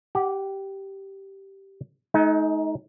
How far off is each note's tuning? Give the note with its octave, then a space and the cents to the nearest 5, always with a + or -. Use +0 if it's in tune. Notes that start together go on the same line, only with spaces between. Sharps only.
G4 -10 F#5 +20
G#3 +45 D#4 +15